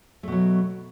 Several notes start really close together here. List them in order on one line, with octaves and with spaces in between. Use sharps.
A3 B2 F#3